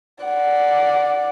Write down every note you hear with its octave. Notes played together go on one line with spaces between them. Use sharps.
D5 F#5